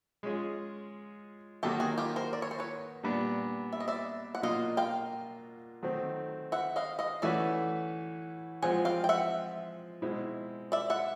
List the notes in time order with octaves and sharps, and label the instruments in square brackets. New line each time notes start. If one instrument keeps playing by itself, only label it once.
[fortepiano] G#3 C#4 F4 G#4
[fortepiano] D#3 F#3 A#3 [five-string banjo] G4 A4
[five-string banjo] F#4 G#4
F4 G4
A#4 C5
D5
C#5
C5
B4 C#5
[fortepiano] A#2 G3 B3 D4
[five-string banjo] E5
D#5
D5 E5
F#5
[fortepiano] B2 F#3 A#3 D4 F4 [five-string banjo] D#5 F5
[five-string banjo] F5 G5
[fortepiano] D#3 F#3 A3 C4
[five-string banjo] E5 F#5
D#5 F5
D#5 F5
[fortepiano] E3 A3 C#4 F#4 B4 [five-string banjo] D5 E5
[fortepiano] F3 G#3 C4 F4 [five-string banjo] F#5 G#5
[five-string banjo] F5 G5
G5
E5 F#5
[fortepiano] B2 G#3 C4 E4
[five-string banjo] D5 E5
E5 F#5